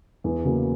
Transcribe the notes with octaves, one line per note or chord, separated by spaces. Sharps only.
E2
C#3 F#3 A#3